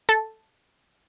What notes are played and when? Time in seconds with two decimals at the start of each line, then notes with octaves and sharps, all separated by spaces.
0.09 A4